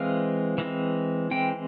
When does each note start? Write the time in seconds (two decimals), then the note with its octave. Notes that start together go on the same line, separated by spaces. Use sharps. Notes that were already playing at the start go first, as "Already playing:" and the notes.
Already playing: E3 G#3 C4 F5
0.58 E3 G#3 C4
1.31 E3 G#3 C4 G5